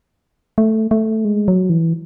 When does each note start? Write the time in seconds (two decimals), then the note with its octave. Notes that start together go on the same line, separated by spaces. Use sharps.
0.58 A3
0.91 A3
1.25 G#3
1.48 F#3
1.70 E3